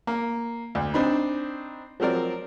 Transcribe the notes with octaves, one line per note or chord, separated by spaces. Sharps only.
A#3
D2
C4 D4 D#4 B5
F3 F#3 C4 A#4 D5